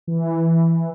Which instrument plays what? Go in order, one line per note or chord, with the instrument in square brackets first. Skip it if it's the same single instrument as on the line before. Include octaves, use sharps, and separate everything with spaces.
[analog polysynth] E3